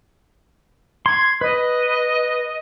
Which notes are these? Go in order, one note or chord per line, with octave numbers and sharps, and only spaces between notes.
C6 G#6
B4 D#5